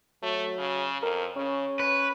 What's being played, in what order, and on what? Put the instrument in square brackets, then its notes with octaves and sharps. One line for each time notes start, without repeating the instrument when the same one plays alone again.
[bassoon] F#3 [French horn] A3
[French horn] C#3
[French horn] F2 [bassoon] A#4
[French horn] C#3 [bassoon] C#4
[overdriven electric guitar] B4 [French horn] C#5